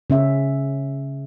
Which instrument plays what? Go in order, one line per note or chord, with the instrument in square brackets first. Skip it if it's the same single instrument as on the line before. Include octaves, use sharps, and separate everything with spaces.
[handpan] C#3 C#4 E5